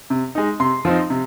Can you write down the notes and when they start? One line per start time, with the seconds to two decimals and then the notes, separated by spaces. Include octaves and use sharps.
0.10 C3
0.35 G#3 D#4
0.60 C3 C6
0.85 F3 C4 D#4
1.10 C3